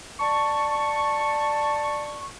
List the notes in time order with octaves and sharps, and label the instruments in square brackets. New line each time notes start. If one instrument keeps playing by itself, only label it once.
[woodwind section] D5 A5 C#6